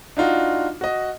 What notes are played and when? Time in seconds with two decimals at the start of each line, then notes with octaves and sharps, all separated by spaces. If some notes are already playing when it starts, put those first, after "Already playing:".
0.17 D4 D#4 F4 F#4
0.81 F#4 D#5